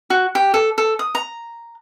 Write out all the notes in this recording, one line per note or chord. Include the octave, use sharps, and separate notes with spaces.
F#4
G4
A4
A4
D#6
A#5